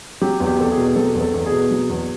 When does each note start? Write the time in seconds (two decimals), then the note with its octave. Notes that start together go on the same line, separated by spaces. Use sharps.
0.21 F#3 G4
0.40 E2
0.46 G4
0.59 E2 A4
0.71 G#4
0.78 B2
0.96 F#3 A4
1.15 E2
1.21 A4
1.34 E2
1.46 G#4
1.52 B2
1.71 F#3
1.90 E2